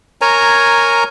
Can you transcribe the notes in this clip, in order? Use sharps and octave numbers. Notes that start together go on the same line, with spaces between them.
A#4 C#5 G#5 A#5